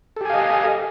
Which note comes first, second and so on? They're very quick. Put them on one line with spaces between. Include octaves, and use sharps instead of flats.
A4 G4 G#5 F5 D#5